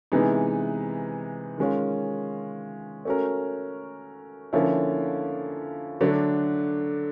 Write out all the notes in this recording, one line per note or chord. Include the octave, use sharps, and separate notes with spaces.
C3 E3 G#3 B3 D#4
D#3 G#3 C#4 F4
A3 C#4 F#4 A#4
D3 F3 A#3 C#4 E4
D3 F#3 A3 D4